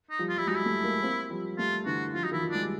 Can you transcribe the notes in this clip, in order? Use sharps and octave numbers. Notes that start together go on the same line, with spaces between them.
D#4
F3 G3
F4
G3 E4
F#3 G#3 D#4
E4
G3 A3
G#3 A#3
A#3 C4
F3 G3
G3 A3 F4
D3 E3 F#4
F3 F4
F#3 D#4
D#3 F3 E4
D#3 F3
G#3 D4
G3